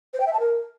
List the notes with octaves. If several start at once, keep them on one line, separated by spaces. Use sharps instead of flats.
C5
G5
E5
A5
A#4